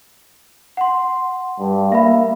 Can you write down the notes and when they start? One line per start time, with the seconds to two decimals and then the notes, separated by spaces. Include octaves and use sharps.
0.77 F#5 C6
1.59 G2
1.92 A#3 E5 F5 B5